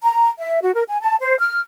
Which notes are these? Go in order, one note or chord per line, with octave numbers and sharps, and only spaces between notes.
A#5
E5
F#4
A#4
G#5
A5
C5
F6